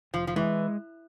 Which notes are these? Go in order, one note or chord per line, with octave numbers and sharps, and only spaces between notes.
F1 F3
F3
E3 G#3